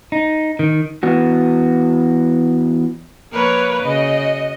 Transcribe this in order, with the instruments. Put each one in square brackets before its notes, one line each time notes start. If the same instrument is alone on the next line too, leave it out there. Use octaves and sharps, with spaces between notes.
[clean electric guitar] D#4
D#3
[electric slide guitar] E3 B3 F#4
[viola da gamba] F3 A#3 A#4 [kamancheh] B4 C#5
[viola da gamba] C#3 F#4 [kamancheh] D#5